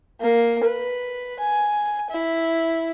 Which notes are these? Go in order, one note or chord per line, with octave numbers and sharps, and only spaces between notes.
A#3
B4
G#5
E4